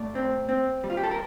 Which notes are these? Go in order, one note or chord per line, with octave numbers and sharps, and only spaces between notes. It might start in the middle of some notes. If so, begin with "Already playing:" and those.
Already playing: A2 D5
C4
C4
G3
F4
G4
A4
A#4